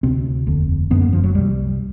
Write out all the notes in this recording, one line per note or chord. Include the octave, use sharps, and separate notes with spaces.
D2 C3 C4
F1 D#2 D3
F#1 F#2 D3 B3
A#3
F3
F#3
C2 C3 G3